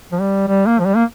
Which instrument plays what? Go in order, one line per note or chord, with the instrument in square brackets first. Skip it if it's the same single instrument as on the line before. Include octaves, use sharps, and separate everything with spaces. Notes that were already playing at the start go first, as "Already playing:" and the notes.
[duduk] F3
G3
G3
A#3
F3
G3
A#3